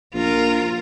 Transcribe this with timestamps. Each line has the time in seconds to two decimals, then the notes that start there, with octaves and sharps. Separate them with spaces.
0.14 A#1 F4 A#4